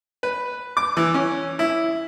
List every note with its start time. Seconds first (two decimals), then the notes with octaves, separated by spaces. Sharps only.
0.23 B4
0.77 D6
0.97 E3
1.14 C#4
1.59 E4